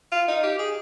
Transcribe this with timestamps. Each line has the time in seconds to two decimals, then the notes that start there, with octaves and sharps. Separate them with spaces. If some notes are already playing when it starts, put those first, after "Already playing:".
0.12 F4
0.28 D#4
0.43 G4
0.59 G#4